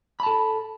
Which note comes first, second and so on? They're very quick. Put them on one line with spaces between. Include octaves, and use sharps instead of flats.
B5 A5 A4